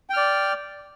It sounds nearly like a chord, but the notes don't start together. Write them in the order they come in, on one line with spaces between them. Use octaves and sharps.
G5 F6 D5